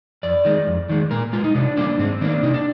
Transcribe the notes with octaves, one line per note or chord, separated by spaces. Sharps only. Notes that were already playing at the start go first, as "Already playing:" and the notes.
F2 D5
D#3 G#3
F2
D#3 G#3
A#2 A#4
G#3 F4
D#4
C3 D4
G3 A#3 D4
G#2 C4
D#3 A#3 D4
C3 D#4
D4